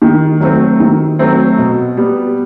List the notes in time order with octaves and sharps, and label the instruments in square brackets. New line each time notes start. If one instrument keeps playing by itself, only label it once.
[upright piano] D#3
F#3 A3 C4
D#3
F#3 A3 C4
B2
G3 B3